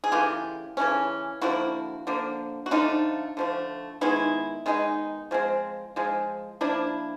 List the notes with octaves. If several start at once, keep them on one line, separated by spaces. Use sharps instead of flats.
G#4
C#3 E3 A3 F4 G4
C#3 E3 A3 C#4
D3 F3 A#3 E4 F#4
D3 F3 A#3
F#4
D3 F3 A3 D#4 F4
D3 F3 A3
D#3 G#3 B3 D#4 E4
D#3 G#3 B3 D#4
F3 G#3 C4
F3 G#3 C4
F3 A#3 D4 E4